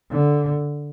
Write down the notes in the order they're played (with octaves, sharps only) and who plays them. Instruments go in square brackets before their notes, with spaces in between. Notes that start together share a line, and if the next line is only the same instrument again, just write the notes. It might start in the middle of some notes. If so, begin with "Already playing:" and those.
[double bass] D3